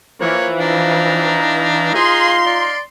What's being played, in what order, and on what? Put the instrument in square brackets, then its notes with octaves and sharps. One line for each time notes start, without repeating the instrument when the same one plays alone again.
[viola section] E3 [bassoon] F3 [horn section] A#3 [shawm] C#5
[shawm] D4 [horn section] D#4 F5 A#5
[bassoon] F4 [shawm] G#4 [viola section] C6
[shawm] D5